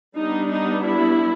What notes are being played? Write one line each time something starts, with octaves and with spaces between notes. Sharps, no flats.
G3 B3 D4 D#4
D#4
E4